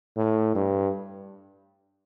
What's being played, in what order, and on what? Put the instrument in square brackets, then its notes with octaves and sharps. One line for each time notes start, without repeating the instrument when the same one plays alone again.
[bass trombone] A2
G2